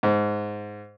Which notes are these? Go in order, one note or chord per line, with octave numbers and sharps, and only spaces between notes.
G#2